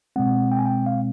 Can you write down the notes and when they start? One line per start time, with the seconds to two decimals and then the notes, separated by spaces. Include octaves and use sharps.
0.16 B2 G#3 C4 F#5
0.52 G5
0.59 G#5
0.66 G5
0.86 F5